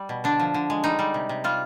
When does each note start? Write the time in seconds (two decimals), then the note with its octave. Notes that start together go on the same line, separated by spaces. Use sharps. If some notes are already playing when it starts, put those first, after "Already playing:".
Already playing: G3
0.09 B2
0.24 D3 D4
0.40 F3
0.54 D3
0.70 G#3
0.84 G3 D#4
0.99 G3
1.14 C3
1.29 C3
1.44 G3 F4